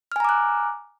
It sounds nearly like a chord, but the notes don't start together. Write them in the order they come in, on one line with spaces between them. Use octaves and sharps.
F6 G#5 A#5 D6 F#6